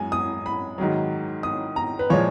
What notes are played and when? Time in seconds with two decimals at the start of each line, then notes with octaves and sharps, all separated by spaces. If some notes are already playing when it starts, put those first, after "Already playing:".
Already playing: F#2 G#3 G#5
0.12 D#6
0.46 B5
0.78 G#2 D#3 F#3
1.43 D#6
1.76 A#5
1.99 B4
2.10 A#2 F3 G#3 C#5